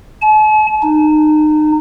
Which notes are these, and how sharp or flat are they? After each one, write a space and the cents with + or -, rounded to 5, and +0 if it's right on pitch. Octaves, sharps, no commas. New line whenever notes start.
A5 -45
D#4 -30